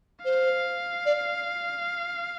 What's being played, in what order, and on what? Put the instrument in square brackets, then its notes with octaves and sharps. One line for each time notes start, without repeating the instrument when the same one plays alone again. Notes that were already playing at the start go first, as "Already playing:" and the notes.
[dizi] C5 [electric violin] F5
[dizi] D5